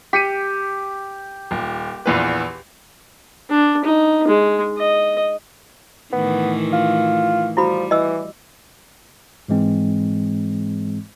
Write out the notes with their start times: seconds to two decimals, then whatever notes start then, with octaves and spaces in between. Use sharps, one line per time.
0.13 G4 B6 C#7 D#7
1.51 D#1
2.06 A#1 E2 B4
3.50 D4
3.85 D#4
4.28 G#3
4.77 D#5
6.12 A2 D#3 E3 B3
6.73 F4
7.57 F3 G3 E4 F#4 B5
7.91 E3 D#5 E6
9.48 G#2 E3 G#3 C4